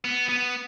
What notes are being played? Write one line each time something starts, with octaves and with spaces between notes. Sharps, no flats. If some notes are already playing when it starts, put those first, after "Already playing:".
B3
B3